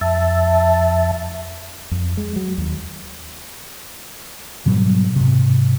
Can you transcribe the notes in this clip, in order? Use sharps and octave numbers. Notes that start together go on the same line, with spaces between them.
F2 E5 A5
F2
G#3
F#3
D#2
G#2 B2 F#3 G3
G#2 C3